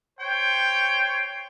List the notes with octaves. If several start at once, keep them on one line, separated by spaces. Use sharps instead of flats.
C5 C#5 G5